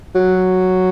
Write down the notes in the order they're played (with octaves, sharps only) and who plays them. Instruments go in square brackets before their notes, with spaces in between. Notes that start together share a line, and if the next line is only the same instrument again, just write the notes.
[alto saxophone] F#3